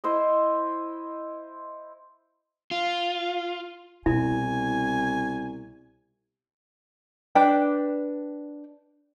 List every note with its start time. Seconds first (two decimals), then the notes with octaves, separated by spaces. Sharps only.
0.04 E4 C5 D#5
2.71 F4
4.06 C2 B2 E4 G#5
7.35 D4 B4 G5